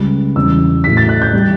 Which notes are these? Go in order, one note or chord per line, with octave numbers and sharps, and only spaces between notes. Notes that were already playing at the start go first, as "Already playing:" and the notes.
Already playing: C#2 C#3 G3 B5
E2 C#3 G3 E6
A2 F#3 B6
A6
F#6
G6
E3 G3